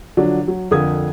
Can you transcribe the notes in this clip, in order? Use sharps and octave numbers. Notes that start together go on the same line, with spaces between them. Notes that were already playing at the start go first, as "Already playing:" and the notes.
D3 F3 F#3 D4
F#3
F2 D3 F4 A#4 D#6 G#6